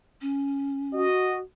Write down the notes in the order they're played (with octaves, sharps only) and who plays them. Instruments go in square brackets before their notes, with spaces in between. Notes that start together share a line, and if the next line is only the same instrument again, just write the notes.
[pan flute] C#4
[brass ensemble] F#4 [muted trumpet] D#5